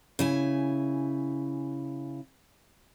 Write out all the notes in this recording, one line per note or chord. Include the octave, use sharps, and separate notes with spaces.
C#3 E4 G#5